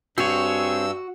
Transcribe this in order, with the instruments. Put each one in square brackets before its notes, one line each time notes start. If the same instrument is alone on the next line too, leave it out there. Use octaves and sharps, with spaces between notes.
[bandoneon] G2 E6 [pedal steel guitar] C4 G#4 C#5 [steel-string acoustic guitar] F#4